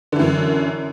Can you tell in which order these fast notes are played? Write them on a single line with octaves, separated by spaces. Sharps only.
D3 E3 F#2